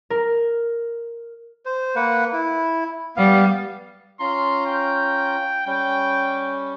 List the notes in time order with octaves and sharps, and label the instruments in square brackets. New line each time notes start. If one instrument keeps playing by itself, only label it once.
[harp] A#4
[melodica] C5
A#3 B4 F#5
E4
[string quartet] G3 [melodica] B3 F5
[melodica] C#4 F4 A#5 [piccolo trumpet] C6
[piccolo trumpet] G5
[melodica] G3 C#4 [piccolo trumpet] G5